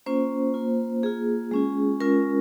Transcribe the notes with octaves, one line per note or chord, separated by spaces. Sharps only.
A#3 C#4 F4 C5
A#3 F4
A#3 F4 G#4
G#3 C#4 F4
G#3 C#4 F4 A#4